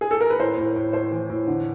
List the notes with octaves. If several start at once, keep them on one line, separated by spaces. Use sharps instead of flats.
G#4
A4
A#4
B4
A2 C5
A2
A2
A2 C5
E3
A2
D3